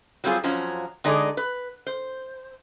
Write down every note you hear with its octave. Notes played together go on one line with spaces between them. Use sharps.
F#3 G3 C4 F4 G#4
F2 F3 F#3 C#4
D3 G#3 D#4 G#4 A4 D5
B4
C5